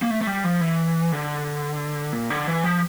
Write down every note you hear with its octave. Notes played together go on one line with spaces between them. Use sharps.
A#3
A3
A3
G3
F3
E3
D3
A#2
D3
E3
F3